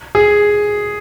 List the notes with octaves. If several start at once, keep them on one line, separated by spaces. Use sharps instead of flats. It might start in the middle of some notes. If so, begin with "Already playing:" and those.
G#4